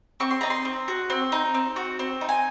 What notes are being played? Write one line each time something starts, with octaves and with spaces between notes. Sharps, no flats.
C4 C#6
C6
D#4 A#5
C6
C4
F#4
C4
D#4
C4
F#4
C4
D#4
G#5